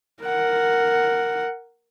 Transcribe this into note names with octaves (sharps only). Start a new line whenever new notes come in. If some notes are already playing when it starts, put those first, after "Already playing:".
A#4 F#5